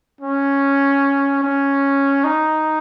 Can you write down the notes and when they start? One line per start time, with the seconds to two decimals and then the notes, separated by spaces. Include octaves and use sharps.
0.21 C#4
1.43 C#4
2.24 D#4